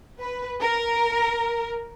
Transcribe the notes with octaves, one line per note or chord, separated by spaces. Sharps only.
B4
A#4